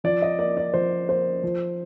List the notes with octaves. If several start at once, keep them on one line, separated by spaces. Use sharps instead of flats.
F3 D5
D#5
A#3 D5
D5
F3 C5
A#3 C5
F3